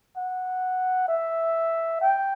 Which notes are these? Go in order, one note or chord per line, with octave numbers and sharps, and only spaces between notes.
F#5
E5
G5